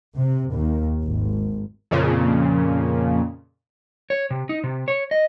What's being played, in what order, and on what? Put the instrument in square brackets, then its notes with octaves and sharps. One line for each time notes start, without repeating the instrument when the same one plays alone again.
[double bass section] C3
D#2
G#1
[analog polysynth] F2 A#2 C#3
[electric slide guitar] C#5
C3
D#4
C3
C#5
D#5